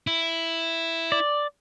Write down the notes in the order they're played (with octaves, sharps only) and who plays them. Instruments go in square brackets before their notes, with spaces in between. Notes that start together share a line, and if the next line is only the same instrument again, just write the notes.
[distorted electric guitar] E4
[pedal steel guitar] D5